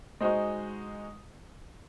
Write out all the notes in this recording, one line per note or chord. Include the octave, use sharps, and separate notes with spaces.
G#3 D#4 F#4 C5